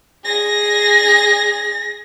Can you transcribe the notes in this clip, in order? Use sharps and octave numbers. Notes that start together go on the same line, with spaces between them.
G#4 A#6